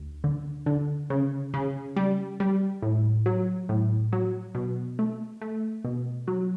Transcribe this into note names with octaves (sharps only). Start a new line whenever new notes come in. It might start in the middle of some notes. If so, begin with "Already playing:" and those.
Already playing: D2
D3
D3
C#3
C#3
G3
G3
A2
F#3
A2
F#3
B2
A3
A3
B2
F#3